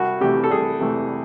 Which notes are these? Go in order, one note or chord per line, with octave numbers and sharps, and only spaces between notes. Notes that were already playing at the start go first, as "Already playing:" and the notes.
Already playing: C2 F#4
C3 E3 A3 G4
A4
C2 G#4
C3 E3 A3